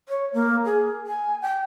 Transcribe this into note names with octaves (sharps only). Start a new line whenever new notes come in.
C#5
A#3
G#4
G#5
G5